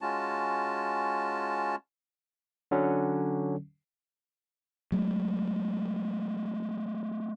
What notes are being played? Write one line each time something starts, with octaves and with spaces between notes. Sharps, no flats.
G#3 C#4 F4 F#4 A5
D3 F#3 C#4
F#3 G#3 A3